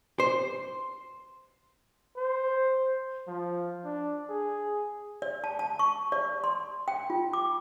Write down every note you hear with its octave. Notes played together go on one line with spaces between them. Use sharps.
C5
C5
F3
D4
G#4
D5
A5
A5
C#6
D5
C6
G5
F4
D6